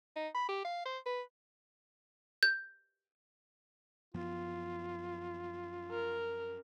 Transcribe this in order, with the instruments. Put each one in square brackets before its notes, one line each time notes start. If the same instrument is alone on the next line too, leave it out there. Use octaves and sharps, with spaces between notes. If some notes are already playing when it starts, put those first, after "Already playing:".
[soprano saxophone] D#4
B5
G4
F5
C5
B4
[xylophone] G6
[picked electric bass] F#2 F3 B3 [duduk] F4
[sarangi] A#4